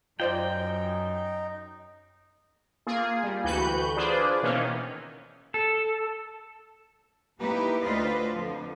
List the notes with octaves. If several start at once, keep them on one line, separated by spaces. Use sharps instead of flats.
F#2 D#4 F4 C5 D5 G5
A#3 F4 G#4
G3
D2 E3 F#4 B4 F#6 G6
D4 F4 G#4 B4 C5 D5
B2 D#3 E3 A#3 C#4
A4
A#3 D#4 E4 G4 B4
D2 F4 B4 C5 D5 D#5
F2 D3 F3